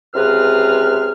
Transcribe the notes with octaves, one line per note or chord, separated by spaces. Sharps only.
C#2 C3 G#4 B4 F6